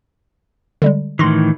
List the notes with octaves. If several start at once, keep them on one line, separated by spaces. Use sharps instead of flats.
D3 G3 G#3
A2 D#3 E3 C6 A#6